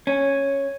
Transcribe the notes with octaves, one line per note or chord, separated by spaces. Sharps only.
C#4